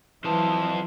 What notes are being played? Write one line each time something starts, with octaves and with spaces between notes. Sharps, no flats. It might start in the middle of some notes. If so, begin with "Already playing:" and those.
F2 E3 F#3 C5 A5